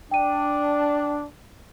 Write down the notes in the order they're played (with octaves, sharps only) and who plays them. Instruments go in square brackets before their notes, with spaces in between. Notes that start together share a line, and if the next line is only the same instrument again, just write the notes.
[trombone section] D4 [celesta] G5 D#7